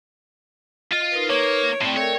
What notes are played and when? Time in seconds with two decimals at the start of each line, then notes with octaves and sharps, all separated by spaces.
0.92 F4 D#5
1.12 D#4 A#4 B4
1.29 A#3 C#5
1.81 A2 A3 C4 D5 G5
1.96 A3 A#4 C#5 D5 G5